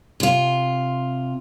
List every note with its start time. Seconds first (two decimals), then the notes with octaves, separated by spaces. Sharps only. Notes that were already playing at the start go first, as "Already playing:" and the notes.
0.20 C3 F4